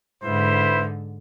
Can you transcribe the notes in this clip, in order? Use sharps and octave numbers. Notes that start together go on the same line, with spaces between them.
G#2 D3 E4 B4 C5